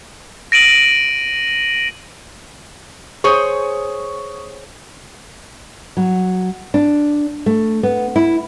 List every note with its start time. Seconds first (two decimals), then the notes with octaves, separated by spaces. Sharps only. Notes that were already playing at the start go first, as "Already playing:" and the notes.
0.52 A#6 D7 D#7 F#7
3.24 G#4 C5 C#5 C#6 D#6
5.97 F#3
6.74 D4
7.46 A3
7.83 B3
8.16 E4